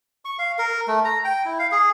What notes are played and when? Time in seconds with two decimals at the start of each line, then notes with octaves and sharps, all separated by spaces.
0.25 C#6
0.39 F5
0.58 A#4
0.87 A3
1.05 A#5
1.24 G5
1.45 E4
1.59 F5
1.72 G#4